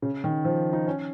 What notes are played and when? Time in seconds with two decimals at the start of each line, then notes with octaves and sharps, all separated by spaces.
0.02 C#3
0.24 D#3
0.45 F3
0.73 D#4
0.87 C#4